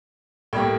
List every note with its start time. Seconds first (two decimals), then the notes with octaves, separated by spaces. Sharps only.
0.53 A2 G3 A#3 G5